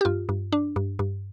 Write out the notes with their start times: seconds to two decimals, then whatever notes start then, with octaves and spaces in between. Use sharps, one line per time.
0.01 G4
0.05 G2 F4
0.29 G2
0.52 D4
0.76 G2
0.99 G2